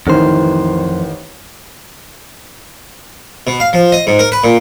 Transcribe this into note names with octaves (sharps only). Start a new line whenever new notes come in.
A1 F2 D#3 E3 C5
B2
F5
F3
D#5
G#2
A#4
B4
A#2